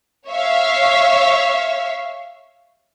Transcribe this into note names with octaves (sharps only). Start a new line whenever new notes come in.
C#5 E5 F5